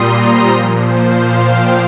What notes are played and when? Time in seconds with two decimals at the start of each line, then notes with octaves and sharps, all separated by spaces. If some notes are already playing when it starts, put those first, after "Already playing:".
Already playing: A#2 G3 A#5 C6 D#6
0.21 C5
0.50 A#2 F3 A#4
0.80 C5
1.08 F5
1.37 G5